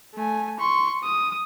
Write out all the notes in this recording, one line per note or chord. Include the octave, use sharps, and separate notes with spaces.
A3 G#5
C6 C#6
D#6